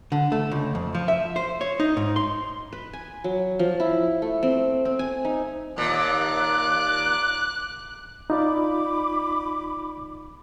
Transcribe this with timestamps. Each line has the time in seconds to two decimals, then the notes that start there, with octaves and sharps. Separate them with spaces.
0.12 D3
0.32 A3
0.52 C#2
0.75 F2
0.95 F3
1.08 E5
1.36 C5
1.61 C#5
1.80 D#4
1.97 G#2
2.16 C6
2.73 B4
2.93 G#5
3.24 F#3
3.59 F3
3.80 E4
4.22 A3
4.43 C4
4.85 C4
4.99 G#5
5.25 D#4
5.78 D#2 A#2 D6 F#6
8.30 D#4 F4 D5 B5 D6